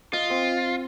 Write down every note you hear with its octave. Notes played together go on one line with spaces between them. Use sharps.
F4 D#5
C4